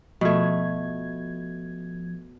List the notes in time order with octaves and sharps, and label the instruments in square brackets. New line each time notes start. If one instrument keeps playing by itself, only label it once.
[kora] B2 A3 [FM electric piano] F3 G#6